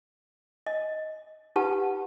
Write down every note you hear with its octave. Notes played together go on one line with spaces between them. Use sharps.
D#5
D#4 F4 G4 B4 F#5 A5